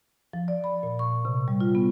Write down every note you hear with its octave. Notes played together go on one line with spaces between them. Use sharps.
F3
D5
B5
A#2
C#6
C3
G3
F4
B3